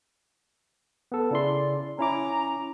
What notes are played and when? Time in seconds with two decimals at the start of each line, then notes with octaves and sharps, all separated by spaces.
1.12 B3 A4
1.31 C#3 E4 D5 C6
1.99 C#4 E4 A#5 D6